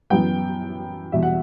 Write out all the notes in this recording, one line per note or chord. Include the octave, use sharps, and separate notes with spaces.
F#2 E3 B3 G5
E2 B2 G3 E5
F#5